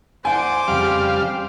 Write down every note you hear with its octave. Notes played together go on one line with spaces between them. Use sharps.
C5 D5 F5 F#5 G#5 D6
F2 C#3 G3 F5